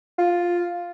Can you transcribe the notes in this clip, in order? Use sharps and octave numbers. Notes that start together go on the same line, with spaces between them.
F4